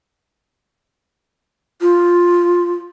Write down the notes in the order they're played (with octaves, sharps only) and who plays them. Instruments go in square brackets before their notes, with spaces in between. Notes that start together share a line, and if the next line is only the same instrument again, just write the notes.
[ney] F4